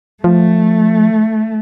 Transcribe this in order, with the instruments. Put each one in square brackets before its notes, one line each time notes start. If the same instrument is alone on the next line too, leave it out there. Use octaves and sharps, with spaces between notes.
[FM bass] F3 [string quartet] A3